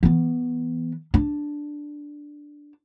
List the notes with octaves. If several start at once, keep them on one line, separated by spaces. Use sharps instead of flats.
E3 B3
D4